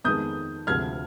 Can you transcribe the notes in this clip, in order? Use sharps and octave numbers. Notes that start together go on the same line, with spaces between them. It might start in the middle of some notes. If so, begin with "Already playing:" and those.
F2 D#3 G#3 B3 D#6 G6
D2 C3 F3 G#3 F6 G#6